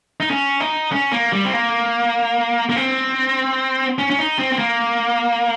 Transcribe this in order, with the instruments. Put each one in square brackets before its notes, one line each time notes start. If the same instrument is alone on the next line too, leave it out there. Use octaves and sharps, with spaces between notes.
[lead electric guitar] D#4
C#4
D#4
C#4
A#3
G3
C4
A#3
A#3
C4
C#4
C#4
D#4
C4
C4
A#3